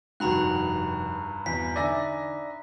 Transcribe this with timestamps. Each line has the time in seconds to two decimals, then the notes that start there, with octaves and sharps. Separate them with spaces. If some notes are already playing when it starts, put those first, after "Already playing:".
0.20 F1 G2 D#3 F#4 G5 A#5 B5 F#6
1.46 E2 B2 B6
1.76 D3 D#4 D5 E5 G#5 A#6